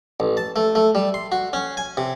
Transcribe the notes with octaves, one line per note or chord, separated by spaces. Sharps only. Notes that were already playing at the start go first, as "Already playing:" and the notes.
A1
A5
A3
A3
G3
C6
F#4
C#4
G#5
C3